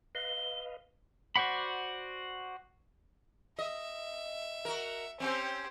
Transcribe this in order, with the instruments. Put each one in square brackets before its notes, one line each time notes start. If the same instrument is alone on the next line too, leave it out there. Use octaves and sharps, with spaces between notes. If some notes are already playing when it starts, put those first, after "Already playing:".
[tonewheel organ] B4 D#5 F5 [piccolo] G7
[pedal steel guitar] F#4 C5 D5 F#5 B5
[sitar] D#5 [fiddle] E5
[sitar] F#4 A#4
[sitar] C4 C#4 [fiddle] G4 C5